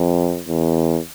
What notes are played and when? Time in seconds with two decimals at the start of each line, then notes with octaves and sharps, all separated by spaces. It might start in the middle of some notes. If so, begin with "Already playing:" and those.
Already playing: F2
0.48 E2